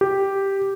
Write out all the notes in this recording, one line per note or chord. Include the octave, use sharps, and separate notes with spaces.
G4